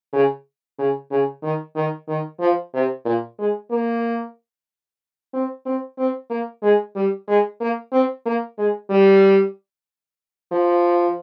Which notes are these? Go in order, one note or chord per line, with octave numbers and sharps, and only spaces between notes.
C#3
C#3
C#3
D#3
D#3
D#3
F3
C3
A#2
G#3
A#3
C4
C4
C4
A#3
G#3
G3
G#3
A#3
C4
A#3
G#3
G3
F3